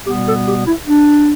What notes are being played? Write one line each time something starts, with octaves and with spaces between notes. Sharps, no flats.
B2 G3 B3 G4
A4
G4
E4
D4